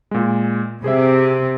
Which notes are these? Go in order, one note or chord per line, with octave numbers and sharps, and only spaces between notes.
A#2 G#3
C3 G#4 C5 E5